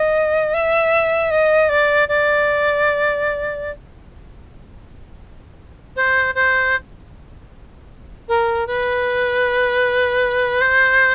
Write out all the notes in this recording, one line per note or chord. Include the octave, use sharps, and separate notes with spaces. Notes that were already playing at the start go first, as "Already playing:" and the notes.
Already playing: D#5
E5
D#5
D5
D5
C5
C5
A#4
B4
C5